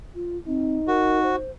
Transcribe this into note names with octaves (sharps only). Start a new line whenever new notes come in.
F4
C4 D#4
F#4 A#4
C5